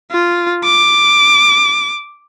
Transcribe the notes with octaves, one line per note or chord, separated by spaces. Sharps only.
F4
D6